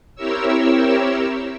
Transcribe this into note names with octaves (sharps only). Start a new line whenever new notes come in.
C4 E4 G4 A#4 C#5 E6